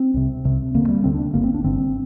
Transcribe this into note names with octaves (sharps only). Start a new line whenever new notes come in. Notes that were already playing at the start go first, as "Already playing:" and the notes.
Already playing: C4
C2 C3
C2 C3
D2 D3 A#3
G3
D2 D3 C4
D4
G1 G2 D3 A#3
C4
D4
G1 G2 D3 C4